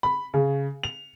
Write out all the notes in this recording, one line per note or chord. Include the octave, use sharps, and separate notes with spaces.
B5
C#3
F7